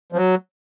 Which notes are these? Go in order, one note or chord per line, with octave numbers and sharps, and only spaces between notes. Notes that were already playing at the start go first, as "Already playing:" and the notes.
F3
F#3